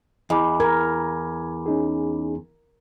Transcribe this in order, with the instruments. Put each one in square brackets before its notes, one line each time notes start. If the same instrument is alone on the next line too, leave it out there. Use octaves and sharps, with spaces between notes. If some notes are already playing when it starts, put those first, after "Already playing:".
[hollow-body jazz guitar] E2 [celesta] E4 B5 D6 [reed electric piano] D#5
[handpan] A#4 [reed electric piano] G#6
[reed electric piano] C#4 D#4 G#4